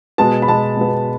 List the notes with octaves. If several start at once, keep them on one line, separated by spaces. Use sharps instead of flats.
B2 G#3 B3 A5
B5
B2 G#3 B3 A5
B2 G#3 B3